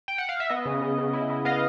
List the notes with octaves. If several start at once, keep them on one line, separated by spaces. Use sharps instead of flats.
G5
F#5
F5
E5
B3 D#5
C#3
C#3
C#3
E4
E4
B3 D#5 F5